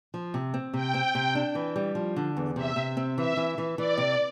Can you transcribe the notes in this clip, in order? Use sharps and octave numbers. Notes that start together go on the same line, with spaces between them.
F3
C3
C4
C3 G5
C4
C3
D4
E3
G3
F3
D3
E2
C3 E5
C3
C4
E3 E5
E3
E3
E3 D5
C3